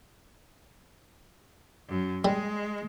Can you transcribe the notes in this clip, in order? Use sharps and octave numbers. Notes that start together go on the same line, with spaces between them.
F#2
G3 G#3